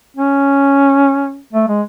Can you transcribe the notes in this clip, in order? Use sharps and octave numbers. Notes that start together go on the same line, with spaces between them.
C#4
A3
G#3